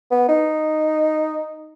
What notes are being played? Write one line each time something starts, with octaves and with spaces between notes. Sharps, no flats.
B3
D#4